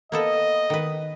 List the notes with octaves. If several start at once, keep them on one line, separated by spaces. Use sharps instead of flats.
A#3 B3 A4 D#5
D#3 B4